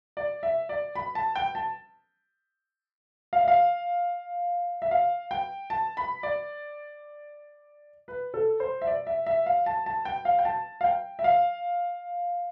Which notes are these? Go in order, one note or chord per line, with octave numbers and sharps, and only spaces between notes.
D5
E5
D5
B5
A5
G5
A5
F5
E5
F5
E5
F5
G5
A5
B5
D5
B4
A4
C5
E5
D5
E5
E5
F5
A5
A5
G5
F5
G5
A5
F5
G5
E5
F5